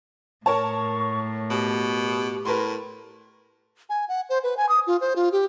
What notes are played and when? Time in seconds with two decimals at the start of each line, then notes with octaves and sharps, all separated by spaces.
0.46 A2 A#4 C#5 A5 C#6
1.50 B2 G4
2.45 A2 A#4 B4 C6
3.89 G#5
4.09 F#5
4.30 C5
4.44 B4
4.57 G#5
4.69 D#6
4.87 F4
5.01 C5
5.16 F4
5.32 G4